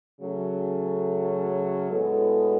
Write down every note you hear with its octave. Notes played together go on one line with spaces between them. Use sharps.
C#3 F#3 A3 C#4
A2 G#3 B3 F#4 A4